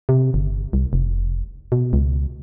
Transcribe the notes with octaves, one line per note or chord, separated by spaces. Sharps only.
C3
G1
C2
F1
B2
C#2